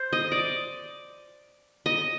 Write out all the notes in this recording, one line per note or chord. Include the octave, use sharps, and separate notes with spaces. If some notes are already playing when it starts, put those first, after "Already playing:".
Already playing: C5
D#5
D5
D#5